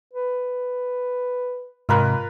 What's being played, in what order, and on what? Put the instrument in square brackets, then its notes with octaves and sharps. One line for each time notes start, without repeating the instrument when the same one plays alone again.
[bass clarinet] B4
[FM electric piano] G#2 C3 [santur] F4 A#4 B4